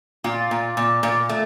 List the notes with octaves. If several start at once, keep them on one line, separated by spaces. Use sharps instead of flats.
A#2 F4
A#2
A#2
A#2
A3